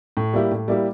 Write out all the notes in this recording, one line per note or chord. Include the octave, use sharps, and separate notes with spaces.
A2
G3 A#3 E4 G4
A2
G3 A#3 E4 G4